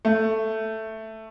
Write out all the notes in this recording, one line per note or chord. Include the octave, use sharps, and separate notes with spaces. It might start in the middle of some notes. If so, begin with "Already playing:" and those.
A3